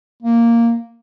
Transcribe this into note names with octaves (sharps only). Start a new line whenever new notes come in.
A#3